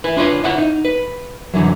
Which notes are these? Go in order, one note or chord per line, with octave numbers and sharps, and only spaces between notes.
E4 B4
D4 F4 B4 C#5
E4 C#5 F#5
D#4
B4
C2 F2 D3 E3 F#3